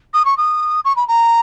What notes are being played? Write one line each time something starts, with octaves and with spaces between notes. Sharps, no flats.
D#6
C#6
D#6
C#6
B5
A#5